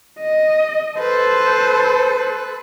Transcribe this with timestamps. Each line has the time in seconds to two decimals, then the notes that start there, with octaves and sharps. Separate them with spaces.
0.19 D#5
0.98 A4 B4 C5